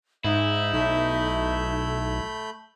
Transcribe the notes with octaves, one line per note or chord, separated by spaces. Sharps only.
G#2 D#4 E4 E5
B1 A3 B5 G6